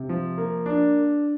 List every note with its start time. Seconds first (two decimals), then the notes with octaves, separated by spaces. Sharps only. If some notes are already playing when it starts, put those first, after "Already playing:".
Already playing: C3
0.09 F3
0.38 A#3
0.66 D4